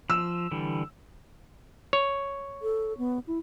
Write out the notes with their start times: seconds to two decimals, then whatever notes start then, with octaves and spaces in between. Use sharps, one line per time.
0.10 F3 E6
0.51 D3 E3 G3
1.93 C#5
2.62 A4
2.98 B3
3.27 E4